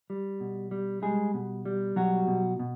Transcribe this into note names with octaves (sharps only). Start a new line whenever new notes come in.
G3
B2
G3
G3 G#3 G#4
B2
G3
B2 F#3 F#4
B2
B2